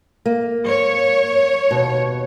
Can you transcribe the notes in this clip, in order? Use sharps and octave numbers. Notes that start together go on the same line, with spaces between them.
A#3
C#5
D#2 B2